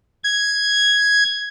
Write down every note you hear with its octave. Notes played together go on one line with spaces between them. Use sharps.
G#6